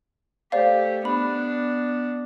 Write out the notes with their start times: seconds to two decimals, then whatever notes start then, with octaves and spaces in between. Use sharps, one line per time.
0.52 A3 G4 C5 D5 F5
1.05 B3 D4 B5